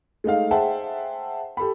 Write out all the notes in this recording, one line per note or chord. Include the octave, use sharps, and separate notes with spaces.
G#3 A3 D#4 F5
G#4 C5 E5 F#5 G5 A5
G4 A4 B5